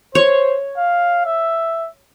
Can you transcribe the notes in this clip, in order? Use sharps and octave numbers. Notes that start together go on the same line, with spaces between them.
C5 C#5
F5
E5